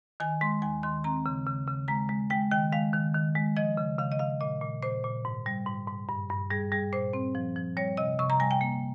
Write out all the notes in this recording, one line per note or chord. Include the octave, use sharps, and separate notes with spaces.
D#3 G#5
G#3 C6
D#2 G#5
D#3 C6
C4 A#5
C#3
C#3
C#3
G#3 A#5
G#3
G#3 G5
D#3 G5
G#3 F5
D#3
D#3
G#3
F3 D#5
C#3
C#3 F5
D#5
C#3 F5
A#2 D#5
A#2
A#2 C5
A#2
G#2
G3
G#2
G#2
G2
G2
G3 G#4
G3 G#4
A#2 C5
C4
F3
F3
G3 C#5
C3 D#5
C3 C#6
A#5
G3 G#5
G5
A#3